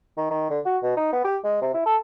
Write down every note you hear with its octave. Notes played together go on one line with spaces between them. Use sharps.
D#3
D#3
D3
F#4
B2
D#4
B3
G4
G#3
C3
E4
A4